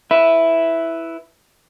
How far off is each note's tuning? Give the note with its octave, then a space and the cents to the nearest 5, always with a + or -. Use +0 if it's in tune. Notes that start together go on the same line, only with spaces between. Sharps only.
E4 +0 B4 +0 E5 +0